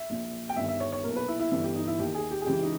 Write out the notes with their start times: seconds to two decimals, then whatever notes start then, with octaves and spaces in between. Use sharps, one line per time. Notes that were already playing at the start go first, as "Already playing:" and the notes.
Already playing: E5
0.10 A#1 A#2
0.49 G5
0.56 G1 G2 D#3 E5
0.68 E5
0.80 C#5
0.92 C#5
1.04 B1 A#2 A#4
1.16 B4
1.28 E4
1.39 E4
1.51 G1 G2 E3 E4
1.63 G4
1.75 D#4
1.87 E4
1.99 D#2 D#3 G4
2.14 G#4
2.31 G4
2.41 G#4
2.46 C#2 C#3 E3 G4
2.63 D#4